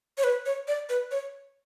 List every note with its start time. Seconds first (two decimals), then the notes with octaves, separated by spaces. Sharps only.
0.18 C#5
0.24 B4
0.46 C#5
0.68 D5
0.89 B4
1.11 C#5